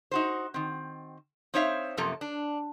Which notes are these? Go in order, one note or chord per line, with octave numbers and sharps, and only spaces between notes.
D#4 F#4 C5
D#3 C4
C4 D#4 C5 C#5 E5 F5
F#2 C3 F3 A#3 A4 A#5
D4